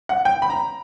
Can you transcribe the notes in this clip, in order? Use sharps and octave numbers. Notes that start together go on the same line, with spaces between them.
F#5
G5
B5
A#5